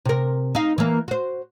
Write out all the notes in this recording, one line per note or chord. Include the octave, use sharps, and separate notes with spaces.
C3 A#4
D#4 F5
E3 A#3
F#4 C5